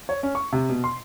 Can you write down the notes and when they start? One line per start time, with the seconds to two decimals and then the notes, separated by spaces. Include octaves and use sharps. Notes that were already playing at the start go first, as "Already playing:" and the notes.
0.09 C#5
0.23 C#4
0.35 C#6
0.52 C3
0.69 B2
0.84 C6